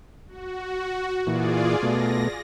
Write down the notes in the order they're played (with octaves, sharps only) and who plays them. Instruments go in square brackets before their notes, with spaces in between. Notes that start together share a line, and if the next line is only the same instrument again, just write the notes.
[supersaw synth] F#4
[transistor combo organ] A#2 E3 [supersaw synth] F4 G#4 D5
[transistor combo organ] B2 A3 [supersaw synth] A#6